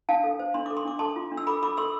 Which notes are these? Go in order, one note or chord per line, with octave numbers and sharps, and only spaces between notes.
D4 F5 A5
A4
C5
D4 C6
A4 D6
C6
D4 D6
A4 A5 C6
F4
D4
E6
A4 B5 D6
A4 B5 D6
A4 C6 E6